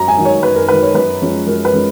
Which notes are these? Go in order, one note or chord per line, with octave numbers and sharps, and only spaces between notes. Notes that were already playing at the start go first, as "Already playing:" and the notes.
Already playing: F#2 A#5
G#5
D#3 F#3
C#5
F#2 B4
A#4
D#3 F#3 B4
C#5
F#2 B4
F3 G#3 C#4
F#2 A#4
B4
F3 G#3 C#4